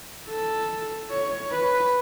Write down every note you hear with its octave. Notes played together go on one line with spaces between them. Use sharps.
A4
C#5
B4